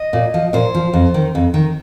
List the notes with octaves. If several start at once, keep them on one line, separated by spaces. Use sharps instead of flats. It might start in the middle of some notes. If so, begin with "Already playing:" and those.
Already playing: D#5
A#2
F3
A#2 C5
F3
F2
D#3
F2
D#3